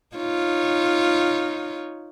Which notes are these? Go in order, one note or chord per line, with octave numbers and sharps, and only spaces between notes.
D#4 F4 C#5